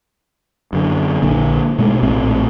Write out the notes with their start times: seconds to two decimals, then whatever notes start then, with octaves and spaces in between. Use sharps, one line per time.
0.73 F#2 D3
1.22 A#1 D3 A#3
1.79 B2 G#3 A3
2.03 A#1 A2 C4